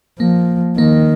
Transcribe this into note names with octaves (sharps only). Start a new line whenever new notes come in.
F3 A#3
D#3 A#3